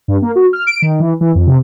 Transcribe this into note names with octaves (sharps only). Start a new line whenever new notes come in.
G2
A#3
F#4
F6
D7
D#3
E3
E3
F2
C3